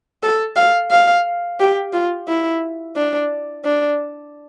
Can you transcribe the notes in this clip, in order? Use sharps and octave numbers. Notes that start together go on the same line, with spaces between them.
A4
F5
F5
G4
F4
E4
D4
D4